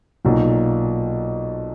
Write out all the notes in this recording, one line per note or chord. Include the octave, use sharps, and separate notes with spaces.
B1 A#2 F#3